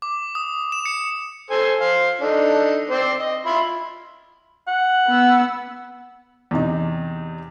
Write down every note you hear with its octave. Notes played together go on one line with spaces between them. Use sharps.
D6
D#6
E7
C#7
A4 C5 G#5
C5 F5
D4 D#4 A4
C4 C5 D5
D#5
F4 E5 B5
F#5
B3 E6
E2 C3 D#4